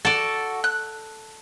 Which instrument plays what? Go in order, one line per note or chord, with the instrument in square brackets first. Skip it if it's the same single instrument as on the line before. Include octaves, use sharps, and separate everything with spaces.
[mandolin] F#4 [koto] A4 D5
[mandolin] F#6